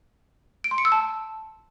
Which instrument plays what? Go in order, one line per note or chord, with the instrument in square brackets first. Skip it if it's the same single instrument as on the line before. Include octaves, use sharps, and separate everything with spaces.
[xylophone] D7
C6
C#7
E6
A5